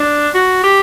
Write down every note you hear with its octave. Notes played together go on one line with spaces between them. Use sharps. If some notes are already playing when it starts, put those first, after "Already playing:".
Already playing: D4
F#4
G4